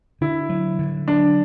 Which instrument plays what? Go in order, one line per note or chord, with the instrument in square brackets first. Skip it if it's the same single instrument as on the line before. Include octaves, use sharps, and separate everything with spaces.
[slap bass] D3 [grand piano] E4
[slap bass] F#3
D3
[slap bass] F#3 [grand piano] D4